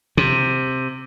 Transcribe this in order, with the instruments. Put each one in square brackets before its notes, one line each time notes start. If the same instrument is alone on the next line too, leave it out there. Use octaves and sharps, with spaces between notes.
[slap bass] C3